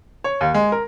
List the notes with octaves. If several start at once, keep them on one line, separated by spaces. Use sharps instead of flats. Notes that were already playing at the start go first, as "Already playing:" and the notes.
C#5
D#2
G#3
A#4